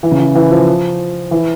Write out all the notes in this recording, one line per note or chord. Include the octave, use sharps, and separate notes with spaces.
E3
C#3
E3
E3
F3
E3